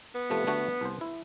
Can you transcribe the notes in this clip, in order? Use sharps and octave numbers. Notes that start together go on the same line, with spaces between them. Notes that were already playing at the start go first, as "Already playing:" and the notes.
B3
C3 F3 A3
D3 A3 F#4
C2 C5
E4